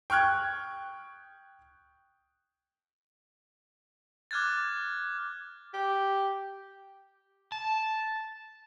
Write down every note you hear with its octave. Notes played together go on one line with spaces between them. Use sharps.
G5 C#6 F6 F#6 G#6
D6 F6 F#6 G#6 A6
G4
A5